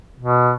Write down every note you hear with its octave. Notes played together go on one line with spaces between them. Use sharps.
B2